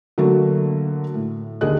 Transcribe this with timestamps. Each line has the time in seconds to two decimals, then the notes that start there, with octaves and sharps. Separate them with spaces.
0.18 D3 F#3 A3 A#3 F#4
1.14 A2
1.61 D#2 D3 G#4 D#5 F#6